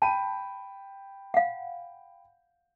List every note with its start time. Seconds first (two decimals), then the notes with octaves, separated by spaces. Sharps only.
0.02 G5 A5 B5 D#7
1.34 F5 F#5